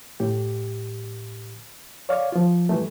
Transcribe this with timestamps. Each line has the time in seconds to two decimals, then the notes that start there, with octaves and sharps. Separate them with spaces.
0.20 A2 G4
2.09 C#5 D5 F5 C#6
2.32 F3 F4
2.69 G2 E3 G3 A3